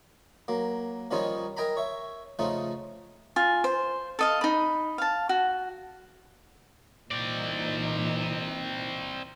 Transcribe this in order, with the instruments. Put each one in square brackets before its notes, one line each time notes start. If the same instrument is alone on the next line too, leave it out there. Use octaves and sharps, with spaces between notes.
[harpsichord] F#3 A#3
D#3 F3 G3 C#4 D#4 C#5
A#4 D#5 G5 G#5 A#5 B5
C#5 E5
C#3 F3 A3 C#4 D#4
[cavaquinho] F4 G#5
C5
A4 D#5 F5
D#4 B5
F5 A5
F#4
[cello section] A#2 E3 D#4 [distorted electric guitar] C4 D5